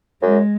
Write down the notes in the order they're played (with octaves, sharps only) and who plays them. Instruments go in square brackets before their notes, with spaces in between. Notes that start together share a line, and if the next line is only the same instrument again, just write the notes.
[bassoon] F#2 [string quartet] G#3